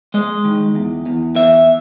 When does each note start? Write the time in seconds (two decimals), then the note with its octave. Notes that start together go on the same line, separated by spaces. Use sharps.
0.14 G#3 D#5
0.45 D#3
0.75 E2
1.06 E2
1.36 E2 E5